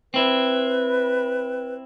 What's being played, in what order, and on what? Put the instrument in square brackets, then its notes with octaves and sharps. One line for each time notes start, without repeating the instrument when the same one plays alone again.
[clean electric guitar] C4 E4 [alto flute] B4